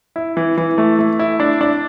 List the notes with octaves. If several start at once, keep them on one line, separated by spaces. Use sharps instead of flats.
E4
E3
E3
A3
A3
E4
D4
D4